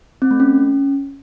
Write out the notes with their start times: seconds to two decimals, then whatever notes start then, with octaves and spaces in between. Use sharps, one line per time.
0.22 C4
0.31 A3
0.40 C#4